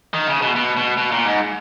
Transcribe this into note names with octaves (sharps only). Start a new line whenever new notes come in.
D#3
C#3
B2
B2
B2
B2
A#2
G#2